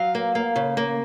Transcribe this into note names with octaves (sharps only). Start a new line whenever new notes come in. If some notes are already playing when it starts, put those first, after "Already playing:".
Already playing: F#3 F5
A#3
A#3
C#3
A#3